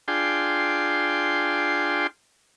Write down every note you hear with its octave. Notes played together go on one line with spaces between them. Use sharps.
D4 F4 G#4 G5 C6